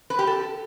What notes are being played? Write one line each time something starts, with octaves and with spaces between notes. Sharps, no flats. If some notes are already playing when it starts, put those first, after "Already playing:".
B4
G4
A4